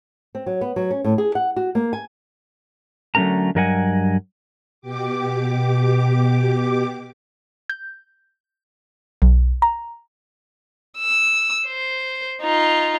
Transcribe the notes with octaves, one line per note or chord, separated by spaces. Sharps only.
C4
F#3
B3
F#3
C#4
A2
G#4
F#5
F#4
A#3
G#5
D3 F#3 A3 C#4 A#4 A#5
G2 F#3 A#4 D#5 F#5 G#5
B2 G4 D6
G6
B1
A#5
E6
C5
D#4 F4